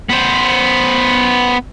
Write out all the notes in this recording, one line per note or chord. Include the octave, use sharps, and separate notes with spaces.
B3 C5